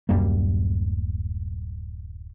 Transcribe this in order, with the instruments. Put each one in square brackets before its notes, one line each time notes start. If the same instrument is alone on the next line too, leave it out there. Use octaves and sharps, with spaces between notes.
[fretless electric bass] D1 F#2 G3 A#3